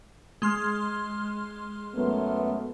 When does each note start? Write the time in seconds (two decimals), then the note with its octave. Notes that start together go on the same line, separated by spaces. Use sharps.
0.42 G#3 C6 F6
1.94 F#2 A3 B3